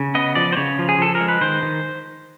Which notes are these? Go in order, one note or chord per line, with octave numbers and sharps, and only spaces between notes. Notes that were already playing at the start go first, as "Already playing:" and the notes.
Already playing: C#3
B3 D#5
F3 D5
C5
C#3 C#5
F3
G#4
F3 A4
A#4
G#3
B4
D#3 C5
D#3